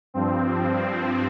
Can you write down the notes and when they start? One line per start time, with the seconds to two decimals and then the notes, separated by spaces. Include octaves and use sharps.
0.14 G2 F3 C4